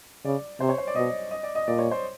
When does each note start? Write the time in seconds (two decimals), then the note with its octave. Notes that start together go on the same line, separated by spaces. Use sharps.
0.25 C#3 D5
0.60 C3 C5
0.69 C#5
0.78 C5
0.87 D5
0.95 B2 D#5
1.31 D#5
1.43 D5
1.55 D#5
1.67 A#2 D5
1.79 C#5
1.91 C5